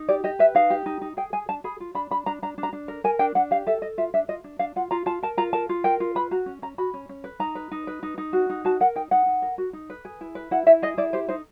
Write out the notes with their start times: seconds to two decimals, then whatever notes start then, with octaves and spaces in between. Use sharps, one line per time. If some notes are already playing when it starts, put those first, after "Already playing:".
Already playing: D#4
0.09 G4 D5
0.24 G4 D#5
0.39 B4 E5
0.55 D#4 F5
0.70 G4
0.86 D#4
1.01 D#4
1.17 G#4 G5
1.33 G#4 G#5
1.49 D4 A5
1.64 G#4 B5
1.80 F4
1.95 D4 B5
2.11 D4 B5
2.26 D4 A#5
2.42 D4 A#5
2.58 D4
2.63 A#5
2.73 D4
2.88 A#4
3.04 A#4 G#5
3.19 D4 G5
3.35 D4 F#5
3.51 G4 F5
3.67 A4 E5
3.82 A4 D#5
3.98 F4 E5
4.14 D4 E5
4.28 F4 D#5
4.44 D4
4.59 D4 F5
4.76 F4 F#5
4.91 F4 A#5
5.06 F4 A5
5.23 A#4 A5
5.37 F4 A#5
5.53 A#4 A5
5.69 F4
5.84 A#4 G5
6.00 F4
6.15 B4 B5
6.31 F#4 A#5
6.46 C#4
6.62 C#4 A#5
6.78 F#4 B5
6.94 C#4
7.09 C#4
7.24 B4
7.40 D#4 A#5
7.55 B4
7.71 D#4
7.87 B4
8.03 D#4
8.18 D#4
8.33 F#4
8.50 D#4
8.65 F#4 A5
8.80 A#4 F#5
8.96 D#4 G5
9.11 D#4 F#5
9.26 D#4
9.42 A#4
9.58 F#4
9.73 D#4
9.90 B4
10.05 G#4
10.21 E4
10.35 B4
10.51 E4 F#5
10.66 E4 E5
10.82 G#4 D#5
10.97 E4 D5
11.13 G4 C5
11.28 D#4 C5